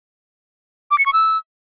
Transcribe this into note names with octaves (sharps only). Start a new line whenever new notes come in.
D6
C#7
C#6
E6